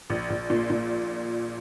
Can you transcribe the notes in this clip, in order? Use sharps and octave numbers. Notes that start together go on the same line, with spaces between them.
A#1
A#1
A#2
A#2